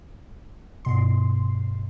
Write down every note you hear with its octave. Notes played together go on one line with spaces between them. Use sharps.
G2 B2 C6